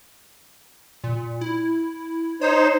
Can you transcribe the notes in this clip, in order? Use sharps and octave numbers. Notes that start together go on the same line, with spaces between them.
A#2
E4
D#4 C5 C#5